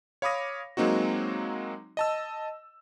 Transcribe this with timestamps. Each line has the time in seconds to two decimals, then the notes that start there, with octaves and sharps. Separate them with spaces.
0.22 C#5 F5 B5 D6 D#6 A#6
0.77 F#3 G#3 A#3 C4 D#4 F#4
1.97 D#5 A5 E6